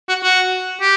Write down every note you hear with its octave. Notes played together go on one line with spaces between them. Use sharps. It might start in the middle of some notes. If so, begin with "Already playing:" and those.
F#4
F#4
G4